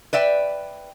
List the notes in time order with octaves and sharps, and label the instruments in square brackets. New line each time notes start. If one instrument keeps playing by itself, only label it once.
[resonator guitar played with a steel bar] B4 D5 E5 G5